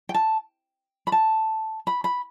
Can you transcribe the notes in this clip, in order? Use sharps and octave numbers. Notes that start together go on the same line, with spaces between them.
G5
A5
B5
A5
B5
B5